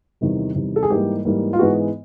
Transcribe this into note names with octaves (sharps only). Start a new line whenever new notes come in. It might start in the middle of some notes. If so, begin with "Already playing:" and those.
E2 C3 D#3 G3
E2 C3 D#3 G3
A4
G#4
G#2 E3 G3 A#3 G4
G#2 E3 G3 A#3
F4
G#2 E3 G#3 B3 F#4